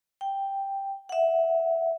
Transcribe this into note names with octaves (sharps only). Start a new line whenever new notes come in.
G5
E5 F#5